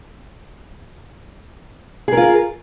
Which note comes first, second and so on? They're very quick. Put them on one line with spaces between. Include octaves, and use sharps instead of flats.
G#4 A#4 F4